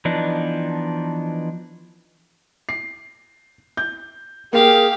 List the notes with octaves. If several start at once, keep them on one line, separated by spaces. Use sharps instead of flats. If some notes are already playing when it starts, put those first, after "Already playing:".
E3 F3 B3 D4 D#4
C7
G6
A#3 G4 G#4 F5